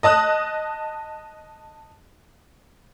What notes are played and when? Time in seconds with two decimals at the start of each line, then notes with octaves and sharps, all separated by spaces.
0.03 D#5 A5 D#6 F#6